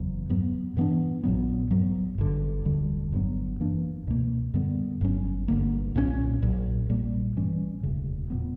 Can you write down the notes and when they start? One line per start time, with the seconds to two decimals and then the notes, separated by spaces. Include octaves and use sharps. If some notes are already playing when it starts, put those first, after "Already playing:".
Already playing: F#1 E2 C#3 F#3
0.30 G2 F#3 B3
0.77 G2 E3 B3 D4
1.24 A#1 A#2 F#3 B3
1.71 G2 F#3 B3
2.18 G1 F#2 D3
2.65 E1 D2 D3 G3
3.12 G1 G2 F#3 B3
3.60 F#2 E3 A#3 D4
4.07 C#2 B2 A#3
4.54 F#2 D3 G3 B3
5.01 G1 G2 F#3 C#4
5.48 G1 G2 D3 A#3
5.95 B1 A#2 F#3 C#4
6.42 A#1 A#2 F#3
6.89 A#1 A#2 G3 A#3
7.37 G2 E3 G3 C#4
7.83 E1 D2 C#3
8.30 A#2 F#3 B3